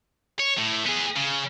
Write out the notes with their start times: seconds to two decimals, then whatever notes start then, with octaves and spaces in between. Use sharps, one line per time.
0.39 C#5
0.58 A2
0.86 B3 G#4
1.16 C#3